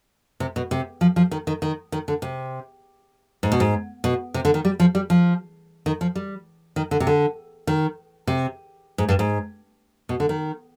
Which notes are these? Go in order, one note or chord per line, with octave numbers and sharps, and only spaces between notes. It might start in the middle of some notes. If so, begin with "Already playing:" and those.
C3
B2
C3
F3
F3
D#3
D#3
D#3
D#3
D3
C3
G#2
B2
G#2
B2
C3
D3
D#3
G3
F3
G3
F3
D#3
F3
G3
D#3
D3
C3
D3
D#3
C3
G#2
G2
G#2
B2
D3
D#3